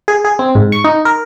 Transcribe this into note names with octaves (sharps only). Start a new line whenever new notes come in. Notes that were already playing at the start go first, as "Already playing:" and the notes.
G#4
G#4
C4
G#2
C#6
D#4
A#4